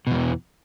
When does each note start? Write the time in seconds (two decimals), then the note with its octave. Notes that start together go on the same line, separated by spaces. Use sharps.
0.07 B2
0.11 E2
0.15 E3